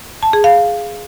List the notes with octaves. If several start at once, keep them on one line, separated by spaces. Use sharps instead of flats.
A5
G#4
F5